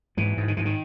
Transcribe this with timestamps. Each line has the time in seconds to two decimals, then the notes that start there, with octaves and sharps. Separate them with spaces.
0.17 G#2 E3
0.37 G#2
0.48 D#3
0.57 G#2 E3
0.65 D#3